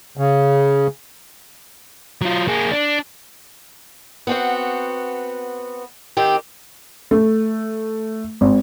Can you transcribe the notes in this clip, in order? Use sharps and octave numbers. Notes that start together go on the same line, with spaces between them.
C#3
F#3 F4
A#3 G#4
D4
B3 C4 F#4
D#3 C4 G4
A3
G#1